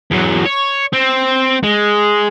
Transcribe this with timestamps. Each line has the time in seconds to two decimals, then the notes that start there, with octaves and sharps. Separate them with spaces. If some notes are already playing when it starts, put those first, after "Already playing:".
0.11 E2 F#3
0.46 C#5
0.93 C4
1.63 G#3